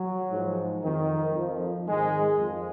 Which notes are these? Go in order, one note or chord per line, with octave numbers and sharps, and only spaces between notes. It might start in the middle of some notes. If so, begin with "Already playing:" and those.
Already playing: F#3
G#2 F3
F2 D#3
F2 F3
G#2 D#3 G#3
F2 F3